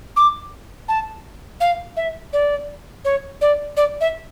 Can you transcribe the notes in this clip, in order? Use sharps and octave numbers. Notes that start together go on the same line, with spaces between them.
D6
A5
F5
E5
D5
C#5
D5
D5
E5